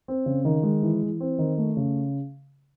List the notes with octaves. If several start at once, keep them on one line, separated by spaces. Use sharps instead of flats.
C4
C#3
D#3
G#3
E3
E3
C4
D#3
A3
C#3